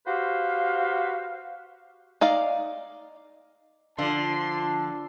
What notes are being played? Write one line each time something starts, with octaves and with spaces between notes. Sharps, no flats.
F#4 G4 B4 C5 F5
D#4 D5 F5
D3 F3 D4 F4 A5 C6